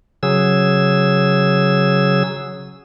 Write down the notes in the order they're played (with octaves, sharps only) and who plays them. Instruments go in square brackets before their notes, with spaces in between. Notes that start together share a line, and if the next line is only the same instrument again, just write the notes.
[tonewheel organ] C#3 F#3 G#4 E6